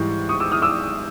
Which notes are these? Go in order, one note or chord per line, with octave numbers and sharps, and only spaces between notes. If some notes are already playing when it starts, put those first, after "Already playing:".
Already playing: G#2 E3 G3 C#6
C#6 D#6
D6 E6
D#6 F6
D6 E6